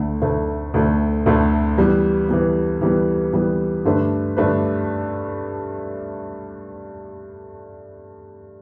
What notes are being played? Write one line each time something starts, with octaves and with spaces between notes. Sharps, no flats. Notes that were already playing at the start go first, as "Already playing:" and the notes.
Already playing: D2 D3 A3
D2 D3 A3
D2 D3 A3
D2 D3 A3
E3 G3 B3
E3 G3 B3
E3 G3 B3
E3 G3 B3
G2 D3 A3 D4 B4
G2 D3 A3 D4 B4